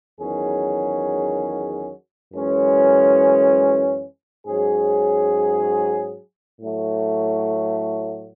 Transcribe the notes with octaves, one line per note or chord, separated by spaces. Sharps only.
E2 D#3 F#3 C#4 G#4
F#2 E3 G#3 C#4
G#2 F#3 C#4 G#4
A2 F#3 A3